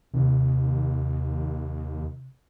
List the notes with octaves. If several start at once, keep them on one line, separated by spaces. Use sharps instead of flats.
D#2 C3